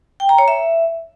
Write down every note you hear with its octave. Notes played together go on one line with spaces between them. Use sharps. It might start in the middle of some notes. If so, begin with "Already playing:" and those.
G5
A#5
C#5
E5